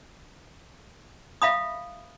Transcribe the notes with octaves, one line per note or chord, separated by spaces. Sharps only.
E5 F5 B5 D#6